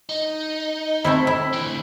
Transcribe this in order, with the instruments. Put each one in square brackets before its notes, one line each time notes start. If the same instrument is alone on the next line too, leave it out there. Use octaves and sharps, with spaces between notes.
[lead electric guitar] D#4
[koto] A3 C4 E4
E4
[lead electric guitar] D2 E3